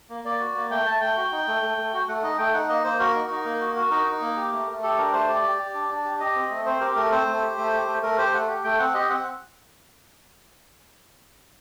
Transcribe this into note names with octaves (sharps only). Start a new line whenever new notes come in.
A#3
A#3 D5
F#4
A#3
A3 G5
A3 A5
A3 G5
F#4
D#4
A3
A3
A3
F#4
A3 F#5
D#4 D#5
A3 G5
D#4 F#5
A#3 D#5
A#3 C5
F#4 A#4
D#4
D#4
A#3
F#4
F#4
D#4 A#4
D#4
A#3
G4
A3
A3
G4 A4
D4 A#4
A3 C5
G4 D5
G4
G4
D4
D4
G4
G4 D#5
C4
A3
C4 C5
G4 A#4
A3 A#4
C4 C5
A3
G4
A3
G4
A3
A3 A#4
G4 C5
A3 F#5
G4
A3 G5
C4 F#5
G4 D#5
C4 F#5